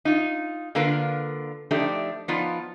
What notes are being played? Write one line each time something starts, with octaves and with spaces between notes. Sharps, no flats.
D#4 F4
D3 A#3 F4 A#4 B4
F3 A3 D4 D#4 G4
F3 B3 D#4 F4 D5